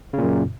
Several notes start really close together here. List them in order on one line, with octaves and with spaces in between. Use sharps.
C#3 A#2 F#2